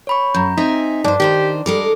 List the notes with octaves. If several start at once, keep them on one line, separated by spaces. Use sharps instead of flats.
C#5 B5 C#6
F#2 A#5 G6
C4 D#4 E5 G#5 B6
G2 D4 C5
D#3 D#4 G4 C5
G3 G#3 A4 A#4 D6